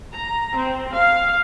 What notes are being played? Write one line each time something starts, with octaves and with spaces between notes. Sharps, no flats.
A#5
C4
F5